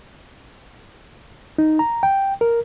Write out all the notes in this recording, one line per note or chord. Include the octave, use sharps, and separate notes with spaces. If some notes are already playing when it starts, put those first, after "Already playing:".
D#4
A#5
G5
A#4